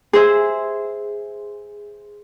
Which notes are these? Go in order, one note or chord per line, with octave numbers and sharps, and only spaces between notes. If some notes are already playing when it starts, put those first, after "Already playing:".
G#4 C5 E5